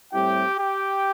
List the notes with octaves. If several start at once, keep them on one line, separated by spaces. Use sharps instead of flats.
A2 G3 C4 E4 G4 G5
G4 G5